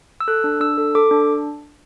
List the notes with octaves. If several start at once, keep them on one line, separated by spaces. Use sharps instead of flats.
E6
A4 F#6
D4
D4 E6
A4
A4 D6
D4